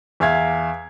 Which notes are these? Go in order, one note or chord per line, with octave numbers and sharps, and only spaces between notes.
E2 E5 F5 G#6